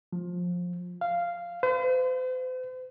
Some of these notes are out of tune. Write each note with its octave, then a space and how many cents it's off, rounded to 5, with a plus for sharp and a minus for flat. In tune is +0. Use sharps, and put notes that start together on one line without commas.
F3 +20
F5 -10
C5 -45